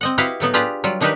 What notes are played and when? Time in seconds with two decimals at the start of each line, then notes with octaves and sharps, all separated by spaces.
0.01 C4 D#5 F#5
0.18 E4 F#4 G4 B4 D#5 F5
0.40 A2 F#3 B3 D#4
0.54 D4 F4 G4 G#4 B4 A#5
0.84 F#3 G3 F4
1.01 D#3 D4 D#4 G4 A#4 B4